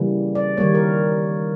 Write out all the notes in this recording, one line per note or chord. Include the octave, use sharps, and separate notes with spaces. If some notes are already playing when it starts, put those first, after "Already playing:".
Already playing: C#3 E3 G3 A#3
D5
D#3 G3 A#3 C#5
A#4